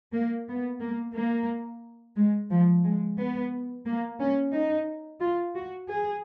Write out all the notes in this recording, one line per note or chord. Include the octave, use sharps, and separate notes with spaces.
A#3
B3
A#3
A#3
G#3
F3
G#3
B3
A#3
C#4
D#4
F4
F#4
G#4